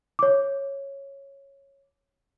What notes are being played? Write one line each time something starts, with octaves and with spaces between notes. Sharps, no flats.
C#5 D6